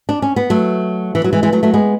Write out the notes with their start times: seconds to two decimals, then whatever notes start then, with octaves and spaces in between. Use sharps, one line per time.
0.09 D4
0.22 C#4
0.36 B3
0.50 F#3 A3
1.15 E3
1.24 F#3
1.33 E3 G#3
1.43 E3 G#3
1.53 F#3 A3
1.63 F#3 A3
1.74 G#3 B3